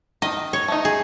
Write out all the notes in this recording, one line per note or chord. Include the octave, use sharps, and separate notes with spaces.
D#3 D#5
C#5
A3 D#4
G#4